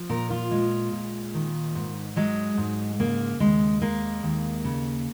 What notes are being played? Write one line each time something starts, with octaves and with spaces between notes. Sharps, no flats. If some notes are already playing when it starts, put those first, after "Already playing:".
Already playing: F3
A#2 A#4
F4
G#3
A#2
D#3
G#2
F#3 G#3
G#2
C#3 A#3
D#2 G#3
G#3 A#3
D#2
C#3